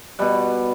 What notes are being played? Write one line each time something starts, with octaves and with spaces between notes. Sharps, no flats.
B2 G3 F#5